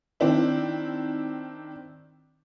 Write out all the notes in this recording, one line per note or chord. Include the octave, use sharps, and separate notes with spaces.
D#3 C4 D4 E4